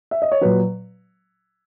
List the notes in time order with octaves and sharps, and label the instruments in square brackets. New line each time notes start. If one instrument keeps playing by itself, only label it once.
[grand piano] E5
D#5
C#5
A#2 F#3 B4